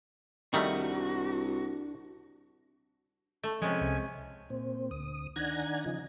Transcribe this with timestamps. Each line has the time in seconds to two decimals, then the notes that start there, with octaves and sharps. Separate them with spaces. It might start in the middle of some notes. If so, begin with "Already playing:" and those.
0.54 C2 D#3 G3 A3 D4 F#4 A#5
3.43 A3
3.62 C3 F3 G#3 C#4 G#5
3.81 C2
4.50 A#2 C4
4.91 D2 D#6
5.36 D#3 D4 F#5 G#5 A#5 G#6
5.86 C#3 F3 D#4